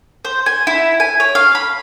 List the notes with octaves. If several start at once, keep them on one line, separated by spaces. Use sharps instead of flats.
C5
G#5
E4
G#5
C#5
F5
B5